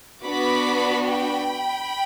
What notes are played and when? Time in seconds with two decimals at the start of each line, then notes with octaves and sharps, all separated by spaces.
0.24 B3 D4 F#4 B5 D6
1.04 G5 B5